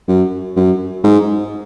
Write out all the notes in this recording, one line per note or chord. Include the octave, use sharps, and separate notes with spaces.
F#2
F#2
G#2